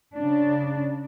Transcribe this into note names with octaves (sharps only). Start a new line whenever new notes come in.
C#3 D4